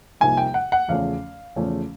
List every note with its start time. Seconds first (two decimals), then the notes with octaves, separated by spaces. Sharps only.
0.20 C2 C3 F3 A#3 D#4 G#5
0.37 G5
0.54 F#5
0.72 F#5
0.88 E2 C#3 F3 A3 C#4 F5
1.56 E2 C#3 F3 A3 C#4